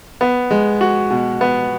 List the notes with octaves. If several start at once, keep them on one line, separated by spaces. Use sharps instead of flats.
B3
G#3
F#4
B2
B3